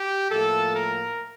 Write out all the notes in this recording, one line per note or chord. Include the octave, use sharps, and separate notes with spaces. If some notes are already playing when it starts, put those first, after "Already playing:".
Already playing: G4
A2 F3 A#3 A4
A#4